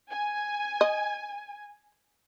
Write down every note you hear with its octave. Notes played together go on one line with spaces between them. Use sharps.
G#5
D#5